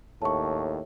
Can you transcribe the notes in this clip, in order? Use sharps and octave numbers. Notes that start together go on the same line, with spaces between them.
D#2 A2 A5 C#6